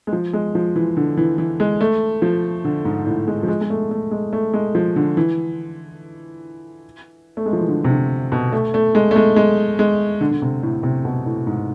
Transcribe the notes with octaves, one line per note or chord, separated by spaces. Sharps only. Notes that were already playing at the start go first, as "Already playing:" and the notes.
G#3
F3
G#3
F3
E3
D3
E3
E3
G#3
A3
F3
D3
G#2
A2
G#3
F3
G#3
G#3
A3
A3
G#3
A3
G#3
F3
D3
E3
A3
G#3
F3
E3
D3
C3
D3
B2
A3
A3
G#3
A3
G#3
G#3
G#3
D3
D3
C3
A2
C3
B2
A2
G#2